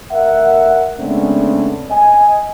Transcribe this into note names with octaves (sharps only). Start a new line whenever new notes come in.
D2 A#4 E5 F#5
C#3 G#3 A3 B3 C4 D4
D#5 G#5